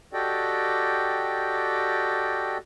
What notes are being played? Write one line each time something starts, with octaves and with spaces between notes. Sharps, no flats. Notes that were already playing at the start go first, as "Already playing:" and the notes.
F#4 G4 A4 D5 D#5 G5